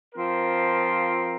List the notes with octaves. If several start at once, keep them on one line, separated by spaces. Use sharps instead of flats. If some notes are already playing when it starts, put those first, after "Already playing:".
F3 C4 F4 A#4